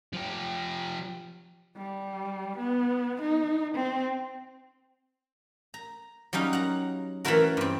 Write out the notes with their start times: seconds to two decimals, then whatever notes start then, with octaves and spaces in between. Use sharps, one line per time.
0.13 F3 G4
1.76 G3
2.58 B3
3.22 D#4
3.75 C4
5.74 A#5
6.33 F#3 G3 C#4 D#4 F5
6.53 F#5 A#5
7.25 E3 A3 C#4 E4 F#4 A#4
7.57 G2 C4